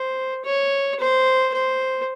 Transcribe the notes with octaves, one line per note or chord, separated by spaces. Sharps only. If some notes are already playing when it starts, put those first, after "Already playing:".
Already playing: C5
C#5
C5
C5